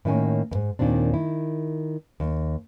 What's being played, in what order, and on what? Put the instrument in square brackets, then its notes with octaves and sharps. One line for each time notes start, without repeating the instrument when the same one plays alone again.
[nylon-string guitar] A2 D#3 A#3 C#4 G#5
E2 G#2
D#2 A#2 D#3 C4 D4
D#3 E4
D#2